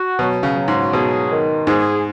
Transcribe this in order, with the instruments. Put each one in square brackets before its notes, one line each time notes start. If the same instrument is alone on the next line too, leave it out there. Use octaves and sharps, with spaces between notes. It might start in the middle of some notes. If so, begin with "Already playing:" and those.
Already playing: [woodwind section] F#4
[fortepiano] B2 [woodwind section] F#3
[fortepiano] C#3
[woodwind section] F#3
[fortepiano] G#2
[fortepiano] B2 [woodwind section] G#4
[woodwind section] D#3
[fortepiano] G#2 [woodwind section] G#4